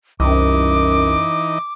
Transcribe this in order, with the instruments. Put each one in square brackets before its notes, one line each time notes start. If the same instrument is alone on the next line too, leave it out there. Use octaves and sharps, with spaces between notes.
[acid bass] C2 [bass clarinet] F#2 [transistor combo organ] E3 D#4 D#5 [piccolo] D6